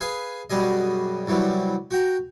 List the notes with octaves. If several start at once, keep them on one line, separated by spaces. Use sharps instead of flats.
G#4 B4 F5 G#5
F#2 B2 G3 G#4 D#5
C2 E3 F#3 G3
F#4 G5 A#5